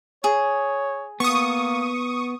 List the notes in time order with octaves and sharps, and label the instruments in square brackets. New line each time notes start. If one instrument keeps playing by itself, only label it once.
[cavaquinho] G#4 [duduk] C#5
[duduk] A#3 [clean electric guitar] B3 [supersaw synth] C#6 D#6